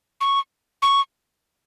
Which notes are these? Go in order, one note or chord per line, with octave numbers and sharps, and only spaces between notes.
C#6
C#6